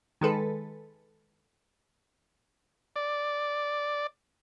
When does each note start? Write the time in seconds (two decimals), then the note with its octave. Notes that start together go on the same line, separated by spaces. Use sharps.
0.21 D#3 G#3 A4 B4
2.96 D5